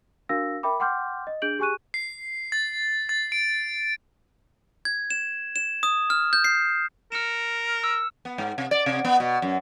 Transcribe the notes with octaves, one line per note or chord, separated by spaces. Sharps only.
D4 F#4 A#4 F5 E6 A#6
A#4 E5 G5 B5 D6
F#5 G5 C6 D6 F6 G6
D#5
D4 G#4 G6 D7 F#7
G4 G#4 G#5 C#6 F#6 D#7
C7
A6
A6
D7
G#6
E7
E7
D#6
F6
G6
C7
A#4 F6 C#7 E7
E6
B3
G#2
C3
D5
C3
B3
B2
F#2